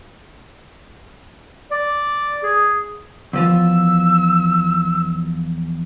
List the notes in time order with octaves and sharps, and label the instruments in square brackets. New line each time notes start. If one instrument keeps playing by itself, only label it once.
[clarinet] D5
G#4
[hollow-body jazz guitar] E2 F3 F4 [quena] E6